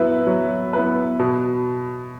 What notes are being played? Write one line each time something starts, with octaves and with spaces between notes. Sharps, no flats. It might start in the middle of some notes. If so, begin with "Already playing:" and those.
Already playing: F#3 B3 E4 B4
F#3
B3 E4 B4
B2